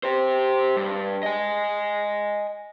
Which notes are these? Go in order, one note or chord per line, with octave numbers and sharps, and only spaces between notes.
G4 C5
G2
D#5 G#5